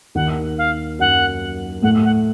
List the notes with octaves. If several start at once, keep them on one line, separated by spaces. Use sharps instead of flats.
D#2 D#3 F#5
F5
F#2 F#3 F#5
A2 A3 F#5
F#5